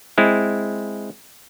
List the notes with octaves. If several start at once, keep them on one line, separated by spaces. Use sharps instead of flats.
G#3 C4 E4